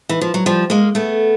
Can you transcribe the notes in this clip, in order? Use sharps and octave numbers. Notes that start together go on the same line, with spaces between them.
E3
F3
F#3
F3 G3
G#3 A#3
A3 B3